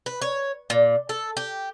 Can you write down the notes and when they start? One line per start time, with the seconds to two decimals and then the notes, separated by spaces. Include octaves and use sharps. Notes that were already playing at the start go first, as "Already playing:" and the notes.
0.06 B4
0.22 C#5
0.70 A#2
1.09 A4
1.37 G4